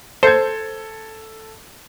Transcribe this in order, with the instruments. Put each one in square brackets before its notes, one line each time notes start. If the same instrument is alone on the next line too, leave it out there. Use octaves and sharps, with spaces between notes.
[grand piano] A4 G#6 [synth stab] C5